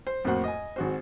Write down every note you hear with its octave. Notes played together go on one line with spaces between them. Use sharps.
C5
F2 A2 A#3 F#4 C5 F#5
D#5 G#5
G#1 F#4 C5